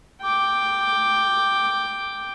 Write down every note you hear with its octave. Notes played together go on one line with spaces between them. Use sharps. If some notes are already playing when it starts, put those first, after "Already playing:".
G5 D6